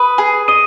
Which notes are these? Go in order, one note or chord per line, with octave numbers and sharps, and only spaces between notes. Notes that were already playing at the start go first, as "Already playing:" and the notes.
Already playing: B4 D#6 D#7
G#4
D#5 D#6 D#7